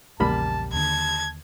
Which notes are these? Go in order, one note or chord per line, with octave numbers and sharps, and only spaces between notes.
A#1 E2 C#3 G3 A#3 A5 B5
D#2 D3 A5 G#6